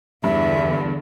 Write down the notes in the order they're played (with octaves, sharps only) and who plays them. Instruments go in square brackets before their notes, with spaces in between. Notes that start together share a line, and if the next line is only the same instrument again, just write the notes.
[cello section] E2 D3 [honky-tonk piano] G2 [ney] E5